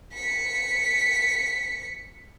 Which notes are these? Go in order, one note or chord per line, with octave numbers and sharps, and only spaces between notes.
B6 C#7